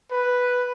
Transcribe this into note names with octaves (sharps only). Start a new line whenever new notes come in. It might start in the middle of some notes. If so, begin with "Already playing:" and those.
B4